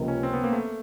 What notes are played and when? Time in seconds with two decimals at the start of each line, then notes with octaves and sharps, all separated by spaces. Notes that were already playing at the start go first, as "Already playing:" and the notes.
Already playing: C#2 C3 F3 A#3
0.08 C#4
0.23 C4
0.33 B3
0.43 A#3
0.53 A3